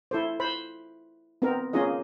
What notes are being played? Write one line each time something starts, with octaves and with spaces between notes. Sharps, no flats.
E4 A4 C5
C5 B5
B3 C4 D#4 A#4
A#3 C#4 D#4 F4 G#4 D#5